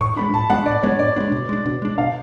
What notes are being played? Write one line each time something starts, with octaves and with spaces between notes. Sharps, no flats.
A2 C#6
G#3 B3 D4 B5
A2 A5
G#3 B3 D4 F#5
A2 D5
G#3 B3 D4 C#5
A2 D5
G#3 B3 D4
B2
G#3 D4
B2
G#3 D4
B2 F5